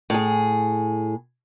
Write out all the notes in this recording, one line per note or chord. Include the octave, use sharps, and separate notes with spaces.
A2 G#4